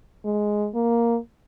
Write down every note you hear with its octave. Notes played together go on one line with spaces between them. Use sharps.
G#3
A#3